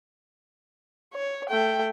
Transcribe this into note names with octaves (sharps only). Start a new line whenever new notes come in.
C#5
A3 G5